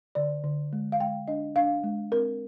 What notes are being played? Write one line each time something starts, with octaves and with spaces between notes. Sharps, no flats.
D3 D5
D3
G#3
F5
G#3 G5
D4 D#5
D4 F5
G#3
C4 A#4